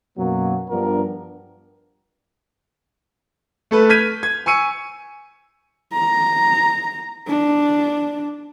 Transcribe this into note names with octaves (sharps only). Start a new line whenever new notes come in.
F#2 B2 F#3 A#3
G2 F3 B3 D4 A#4
A3 A4 B4
F6 G6 G#6 B6 D#7
G#6
G#5 C#6 E6 C#7 D#7
A#5
D4